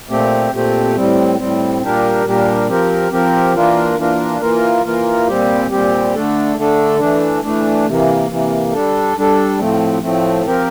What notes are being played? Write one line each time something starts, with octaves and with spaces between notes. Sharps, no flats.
A#2 A3 C4 G4
A#2 A3 C4 G4
A2 G3 C4
A2 G3 C4
A#2 G3 D4 G4 A#4
A#2 G3 D4 G4 A#4
F3 C4 G4 A#4
F3 C4 G4 A#4
E3 A#3 D4 F4 A#4
E3 A#3 D4 F4 A#4
E3 A#3 F4 A#4
E3 A#3 F4 A#4
A#2 G3 C4 G4
A#2 G3 C4 G4
D3 A3 D4 A4
D3 A3 D4 A4
E3 A3 D4
E3 A3 D4
C3 E3 A#3
C3 E3 A#3
G3 D4 A4
G3 D4 A4
A2 F3 A3 C4
A2 F3 A3 C4
F3 C4 G4 A#4